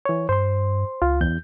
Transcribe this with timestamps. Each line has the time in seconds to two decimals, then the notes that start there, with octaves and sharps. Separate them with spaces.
0.05 E3 C#5
0.29 G2 C5 C6
1.02 C#2 F4
1.21 E2 G6